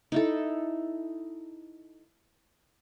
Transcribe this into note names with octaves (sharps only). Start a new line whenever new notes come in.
D#4 E4 A4